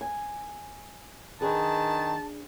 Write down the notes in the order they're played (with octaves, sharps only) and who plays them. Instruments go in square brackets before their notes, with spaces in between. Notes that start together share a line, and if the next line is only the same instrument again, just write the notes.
[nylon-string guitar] G#5
[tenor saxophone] D#3 [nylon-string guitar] D4 G#4 B4 [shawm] A5